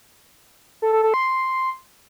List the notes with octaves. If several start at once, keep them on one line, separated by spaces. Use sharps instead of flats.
A4
A4
A4
C6